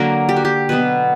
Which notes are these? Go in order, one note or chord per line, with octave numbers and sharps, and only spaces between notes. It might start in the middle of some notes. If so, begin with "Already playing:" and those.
Already playing: D3 F#3 A#3 A#4
G4
F#4
G4
B2 F#3 B3 B4